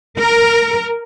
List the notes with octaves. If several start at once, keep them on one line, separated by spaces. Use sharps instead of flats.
A#4